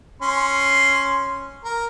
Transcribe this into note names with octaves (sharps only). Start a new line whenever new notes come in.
C#4 C6
A#4